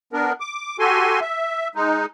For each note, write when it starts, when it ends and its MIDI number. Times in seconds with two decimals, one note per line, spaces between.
0.13 0.33 59
0.13 0.33 62
0.13 0.33 70
0.40 0.77 86
0.79 1.20 66
0.79 1.20 67
0.79 1.20 69
0.79 1.20 80
0.79 1.20 84
1.21 1.68 76
1.75 2.06 56
1.75 2.06 63